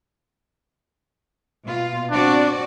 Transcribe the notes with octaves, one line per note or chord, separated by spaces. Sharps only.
B2 F4
C4 D4 F#4 D5